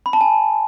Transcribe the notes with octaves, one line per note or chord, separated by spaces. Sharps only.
B5
A5
G#5